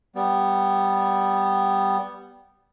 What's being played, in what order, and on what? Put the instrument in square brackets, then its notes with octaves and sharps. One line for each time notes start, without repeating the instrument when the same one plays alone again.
[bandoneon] G3 B3